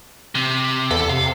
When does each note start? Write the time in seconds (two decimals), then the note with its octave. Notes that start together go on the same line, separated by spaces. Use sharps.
0.35 C3
0.91 E2 A4
1.09 C3 F5